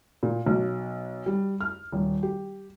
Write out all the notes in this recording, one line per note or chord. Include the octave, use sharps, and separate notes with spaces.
A#2
B1
G3
F6
D#1
G4